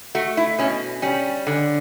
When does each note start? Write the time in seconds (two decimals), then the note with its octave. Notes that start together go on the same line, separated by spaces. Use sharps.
0.15 A3 F#4
0.37 E4
0.59 B2 C#4
1.02 G3 C#4
1.47 D3